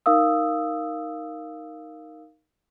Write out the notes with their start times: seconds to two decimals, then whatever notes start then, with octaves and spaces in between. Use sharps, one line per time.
0.06 D#4 A#4 F5 D#6 E6